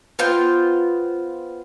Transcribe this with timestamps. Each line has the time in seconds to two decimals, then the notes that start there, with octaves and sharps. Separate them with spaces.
0.19 B3 F4 C5 G5